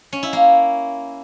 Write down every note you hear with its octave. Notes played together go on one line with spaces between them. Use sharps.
C#4
E4
A#3